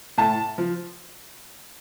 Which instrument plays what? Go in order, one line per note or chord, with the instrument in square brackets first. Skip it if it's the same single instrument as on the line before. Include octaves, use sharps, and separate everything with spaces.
[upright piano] A2 A5
F3